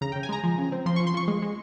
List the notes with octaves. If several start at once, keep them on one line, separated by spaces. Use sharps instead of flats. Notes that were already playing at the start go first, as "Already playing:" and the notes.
C#3 A#5
C#3 G5
G#5
G#3 A#5
F3
C#3
C4
F3 C6
F3 C#6
C6
F3 C#6
G#3
G#3